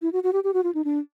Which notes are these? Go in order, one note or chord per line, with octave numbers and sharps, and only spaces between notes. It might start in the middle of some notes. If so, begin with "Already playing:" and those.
E4
F#4
F#4
G4
G4
F#4
F4
D#4
D4